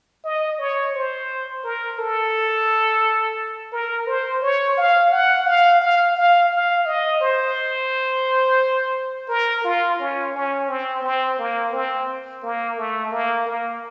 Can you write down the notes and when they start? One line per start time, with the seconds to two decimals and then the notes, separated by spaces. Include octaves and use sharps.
0.24 D#5
0.59 C#5
0.94 C5
1.64 A#4
1.98 A4
3.73 A#4
4.07 C5
4.42 C#5
4.78 F5
5.12 F#5
5.46 F5
5.81 F5
6.16 F5
6.51 F5
6.85 D#5
7.21 C5
9.29 A#4
9.64 F4
9.99 C#4
10.34 C#4
10.68 C4
11.03 C4
11.39 A#3
11.73 C4
12.43 A#3
12.78 A3
13.12 A#3
13.47 A#3